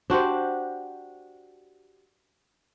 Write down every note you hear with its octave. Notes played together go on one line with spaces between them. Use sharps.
D4 F#4 G4 C5